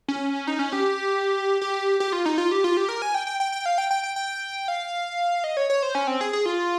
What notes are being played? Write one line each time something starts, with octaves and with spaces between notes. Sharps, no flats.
C#4
D#4
C#4
G4
G4
G4
F4
D#4
F4
G4
F4
G4
A#4
G#5
G5
G5
G5
G5
F5
G5
G5
G5
G5
F5
D#5
C#5
C#5
C5
C#4
C4
G#4
G#4
F4